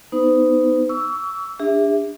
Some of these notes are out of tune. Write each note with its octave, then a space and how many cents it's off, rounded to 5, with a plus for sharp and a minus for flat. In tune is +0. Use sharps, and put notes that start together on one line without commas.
B3 +0 D#4 +0 C5 -40
C#6 +35 E6 +0
D4 +0 G#4 -45 E5 +0